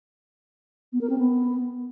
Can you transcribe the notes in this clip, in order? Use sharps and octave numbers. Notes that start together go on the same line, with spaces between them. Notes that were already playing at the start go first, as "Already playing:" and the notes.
B3
A#4
C4
B3